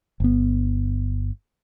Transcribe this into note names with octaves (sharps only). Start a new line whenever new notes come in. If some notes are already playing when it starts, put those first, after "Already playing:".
G1 B3